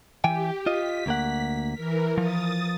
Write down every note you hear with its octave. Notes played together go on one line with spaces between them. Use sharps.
E3 G4 G5 G#5
F4 D#5 B6
D2 A#3 F#5
E3 A#4
F3 D#6 A6